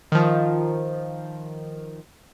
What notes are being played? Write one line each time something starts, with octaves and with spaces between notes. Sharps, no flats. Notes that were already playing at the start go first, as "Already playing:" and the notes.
D#3 F3